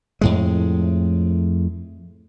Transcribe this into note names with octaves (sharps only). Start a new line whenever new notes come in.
F2 A2 G#3